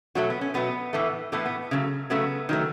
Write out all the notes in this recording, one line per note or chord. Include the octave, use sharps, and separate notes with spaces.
B2 F#3 A3 F#4
B3
C#4
B2 F#3 A3 B3
A2 E3 A3
A2 E3 A3 B3
B3
C#3 F#3 A3
C#3 F#3 A3 B3
D#3 F#3 A3